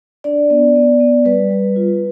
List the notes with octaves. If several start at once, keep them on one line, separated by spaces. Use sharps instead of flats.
D4 D5
B3
B3
B3
G3 B4
G3
F4